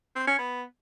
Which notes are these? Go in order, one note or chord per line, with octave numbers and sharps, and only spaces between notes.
C4
C#4
B3